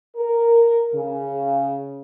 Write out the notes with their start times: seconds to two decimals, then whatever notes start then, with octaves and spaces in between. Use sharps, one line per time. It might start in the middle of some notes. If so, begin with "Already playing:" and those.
0.17 A#4
0.94 C#3